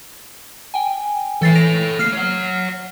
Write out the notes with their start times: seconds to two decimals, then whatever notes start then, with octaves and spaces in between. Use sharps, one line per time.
0.74 G5 G#5
1.42 E3 A4 C#5 A6 C7
1.55 A#6 D7 F7
1.99 A#3 F6 C7
2.13 C#5 F#5